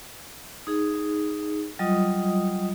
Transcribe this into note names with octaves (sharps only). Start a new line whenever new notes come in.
D#4 G#4
F#3 G3 F4 D#5 D#6